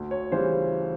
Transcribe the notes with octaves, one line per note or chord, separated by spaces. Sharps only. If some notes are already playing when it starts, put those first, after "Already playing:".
Already playing: D2
C#5
C#3 E3 G3 C5